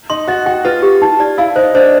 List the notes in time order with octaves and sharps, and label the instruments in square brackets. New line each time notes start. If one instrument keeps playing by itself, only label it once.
[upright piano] D#4 [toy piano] C6
[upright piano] F#4 [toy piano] D#5
[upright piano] F#4 [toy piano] G5
[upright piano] F4 [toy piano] B4
[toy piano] G4
D#4
D5
[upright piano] E4 [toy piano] F5
[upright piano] D#4 [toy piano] C5
[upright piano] D4 [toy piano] C5